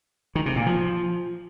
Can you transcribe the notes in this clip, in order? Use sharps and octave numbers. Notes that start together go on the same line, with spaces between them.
D#3
C3
A#2
F3